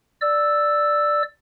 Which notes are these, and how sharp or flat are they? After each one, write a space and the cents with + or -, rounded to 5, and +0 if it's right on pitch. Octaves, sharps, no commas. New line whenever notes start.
D5 +5 E6 +0